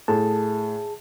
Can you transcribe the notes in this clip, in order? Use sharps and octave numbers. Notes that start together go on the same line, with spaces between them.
A2 G#4 A5